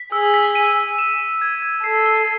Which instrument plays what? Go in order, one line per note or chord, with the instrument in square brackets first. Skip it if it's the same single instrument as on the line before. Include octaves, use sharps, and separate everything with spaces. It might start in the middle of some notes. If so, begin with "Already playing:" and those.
Already playing: [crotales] B6
[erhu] G#4 [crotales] E6
[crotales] B6
D#7
E6
E7
E7
G#6
G#6
[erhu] A4 [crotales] C7
[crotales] G7